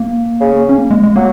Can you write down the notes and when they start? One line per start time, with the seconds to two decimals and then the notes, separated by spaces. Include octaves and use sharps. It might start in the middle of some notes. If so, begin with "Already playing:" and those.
Already playing: A#3
0.40 C#3
0.69 C#4
0.78 A#3
0.91 G#3
1.03 G#3
1.16 F#3 A#3